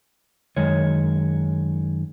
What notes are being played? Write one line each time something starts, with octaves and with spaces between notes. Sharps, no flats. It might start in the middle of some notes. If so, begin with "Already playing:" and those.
F#2 D#3 G#3 C#5